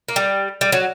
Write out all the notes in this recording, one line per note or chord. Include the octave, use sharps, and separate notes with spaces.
A#3
G3
G3
F#3